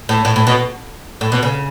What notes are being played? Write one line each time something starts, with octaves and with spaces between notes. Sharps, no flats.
A2
A2
A2
B2
A2
B2
C#3